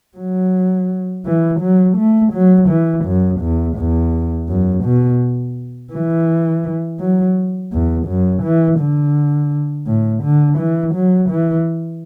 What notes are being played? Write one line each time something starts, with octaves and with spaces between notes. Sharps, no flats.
F#3
E3
F#3
A3
F#3
E3
F#2
E2
E2
F#2
B2
E3
F#3
E2
F#2
E3
D3
A2
D3
E3
F#3
E3